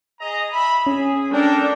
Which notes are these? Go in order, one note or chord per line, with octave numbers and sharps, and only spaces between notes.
G#4 D#5 A#5
E5 B5
C#4 G#4
D4 A4 A#4 G5